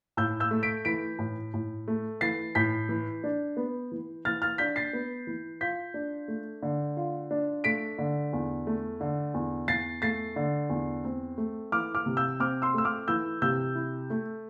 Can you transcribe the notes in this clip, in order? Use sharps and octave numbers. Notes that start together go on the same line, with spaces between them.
A2 E6 G6
E6 G6
A3
B6 D7
E3 B6 D7
A2
A2
A3
E3 A6 C7
A2 G6 B6
E3
D4
B3
E3
E3 F6 A6
F6 A6
D4 G6 B6
A6 C7
B3
E3
F4 G6 B6
D4
A3
D3
F4
D4
A3 B6 D7
D3
E2
A3
D3
E2
E2 A6 C7
A3 A6 C7
D3
E2
C4
A3
E3 D6 F6
D6 F6
C3
E6 G6
C4 D6 F6
C6 E6
A3 E6
D6 F6
E3 E6 G6
C3 E6 G6
E4
A3